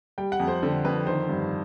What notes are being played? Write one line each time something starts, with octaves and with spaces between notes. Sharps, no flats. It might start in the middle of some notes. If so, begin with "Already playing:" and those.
G3 G5
F#5
F2
C5
D3
F2 B4
D#3 C5
G2